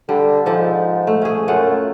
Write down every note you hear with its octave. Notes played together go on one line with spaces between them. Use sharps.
D3 G3
G#2 F3 G4 A4
A3
C#4 G#4
F#2 A3 F4 F#5